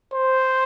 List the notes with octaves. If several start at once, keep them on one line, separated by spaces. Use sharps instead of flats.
C5